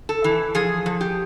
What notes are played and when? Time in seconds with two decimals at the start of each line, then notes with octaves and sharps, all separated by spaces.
0.09 A4
0.24 E3
0.55 F3 G#4
0.86 F3
1.01 G4